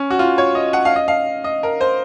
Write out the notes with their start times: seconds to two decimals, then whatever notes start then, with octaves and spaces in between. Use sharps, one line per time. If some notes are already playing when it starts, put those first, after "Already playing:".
Already playing: C#4
0.10 F#4
0.19 F4
0.38 C#5
0.55 D#5
0.73 F#5
0.85 F5
0.96 D#5
1.08 F5
1.44 D#5
1.63 A#4
1.81 C5